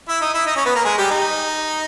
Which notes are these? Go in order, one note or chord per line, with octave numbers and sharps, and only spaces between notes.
E4 E5
D#4 D#5
E4 E5
D#4 D#5
C#4 C#5
B3 B4
A#3 A#4
G#3 G#4
G3 G4
D#4